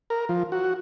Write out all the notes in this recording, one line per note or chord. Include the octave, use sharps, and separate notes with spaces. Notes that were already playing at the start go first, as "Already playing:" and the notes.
A#4
F3
F#4